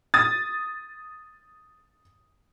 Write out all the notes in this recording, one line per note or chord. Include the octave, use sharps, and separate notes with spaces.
D#6 A6